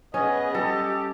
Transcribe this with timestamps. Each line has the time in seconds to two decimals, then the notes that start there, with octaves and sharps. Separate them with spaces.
0.14 B3 C#4 G#4 D#5 G#5
0.55 G3 G4 A4